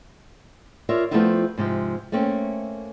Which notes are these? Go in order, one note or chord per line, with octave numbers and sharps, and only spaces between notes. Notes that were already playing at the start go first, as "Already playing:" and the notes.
F4 A#4 C#5 D5 E5
F3 A3 B3 C4 E4 F4
G#2 C3 F3
A3 A#3 C4 C#4